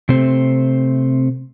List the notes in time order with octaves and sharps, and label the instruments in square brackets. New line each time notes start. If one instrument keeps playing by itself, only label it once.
[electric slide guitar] C3 A3 C4 C5